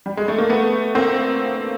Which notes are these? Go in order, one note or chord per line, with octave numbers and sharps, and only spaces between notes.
G3
G#3
A3
A#3
A3 B3
A#3 C4